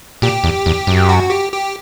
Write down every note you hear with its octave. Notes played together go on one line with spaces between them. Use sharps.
A#2 G4
E2
E2
F#2
F#4
G4
G4